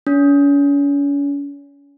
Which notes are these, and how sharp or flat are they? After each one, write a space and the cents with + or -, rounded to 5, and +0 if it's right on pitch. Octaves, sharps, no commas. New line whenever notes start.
C#4 +40